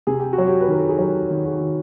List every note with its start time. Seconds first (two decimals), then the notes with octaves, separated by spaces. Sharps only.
0.07 C3 G#4
0.20 G4
0.33 F#4
0.38 F#3
0.47 G4
0.61 B4
0.68 D#3 A#4
0.80 A4
0.89 G#4
0.99 F#3 G4
1.30 D#3
1.45 F#4 G#4
1.60 D#3